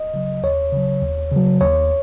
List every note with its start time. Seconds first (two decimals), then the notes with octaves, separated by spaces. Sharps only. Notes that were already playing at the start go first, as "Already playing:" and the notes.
Already playing: D#5
0.14 C#3 F#3
0.43 D#2 C#5
0.72 C#3 F#3
1.03 D#2
1.31 C#3 F#3
1.61 D#2 C#5